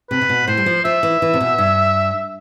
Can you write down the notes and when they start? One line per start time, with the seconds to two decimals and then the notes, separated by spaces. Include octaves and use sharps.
0.10 C3 B4
0.21 C3
0.29 B2
0.47 A2 C5
0.57 G3
0.66 F3
0.85 F3 E5
1.03 E3
1.22 E3
1.34 C3
1.40 B2
1.58 G2